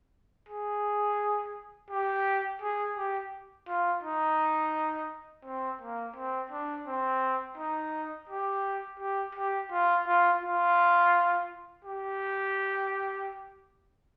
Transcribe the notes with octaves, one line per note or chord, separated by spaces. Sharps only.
G#4
G4
G#4
G4
F4
D#4
C4
A#3
C4
D4
C4
D#4
G4
G4
G4
F4
F4
F4
G4